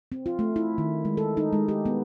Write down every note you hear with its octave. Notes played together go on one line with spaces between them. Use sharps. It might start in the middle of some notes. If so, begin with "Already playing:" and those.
C4
F4
A3
E4
D#3
G#3
A4
D#4
G#3
G4
B3